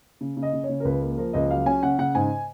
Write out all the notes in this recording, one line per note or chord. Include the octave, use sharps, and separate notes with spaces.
C#3
C#3
D#5
C#3
C#5
C#3
A#4
C#2 B4
A#3
F3 A#4
C#2 D#5
F#3 F5
C#4 G#5
C#3 F#5
C#3 F#5
G#2 G#5